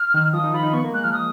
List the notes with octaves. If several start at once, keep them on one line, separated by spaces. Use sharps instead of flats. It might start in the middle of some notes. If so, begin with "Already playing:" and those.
Already playing: F6
D#3
F3 D#6
D#4
F4 B5
D#4
B3 C#6
A#3
G#3 F#6
F3 F6
D#6